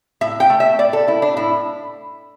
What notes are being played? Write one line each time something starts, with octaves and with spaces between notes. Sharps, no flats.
A2 E5
G5
A3
E5
A2 D5
A4
A3 E4
D4
A2 E4